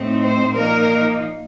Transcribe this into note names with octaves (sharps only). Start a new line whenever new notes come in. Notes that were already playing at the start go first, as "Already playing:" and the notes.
Already playing: A2 A3 C4 D#4
C5
A#2 F3 A#3 D#4 A#4